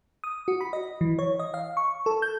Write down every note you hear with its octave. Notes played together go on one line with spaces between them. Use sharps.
D#6
F#4
B5
D#5
E3
C#5
D#5
F5
C#6
A4
G6